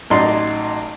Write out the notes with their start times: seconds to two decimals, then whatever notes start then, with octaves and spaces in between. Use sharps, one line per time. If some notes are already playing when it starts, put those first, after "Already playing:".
0.10 A1 F#3 D#4 D5 C6